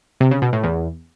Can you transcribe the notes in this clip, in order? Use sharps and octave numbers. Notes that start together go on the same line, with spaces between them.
C3
C#3
B2
A2
E2